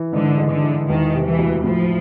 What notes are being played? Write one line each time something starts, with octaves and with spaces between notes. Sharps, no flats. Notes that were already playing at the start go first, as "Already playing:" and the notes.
Already playing: E3
G#2 D3
G#3
D3
E3
E1 D#3
C3
E3
D2
A2 F3